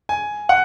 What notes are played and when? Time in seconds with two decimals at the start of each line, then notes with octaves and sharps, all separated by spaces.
0.09 G#5
0.49 F#5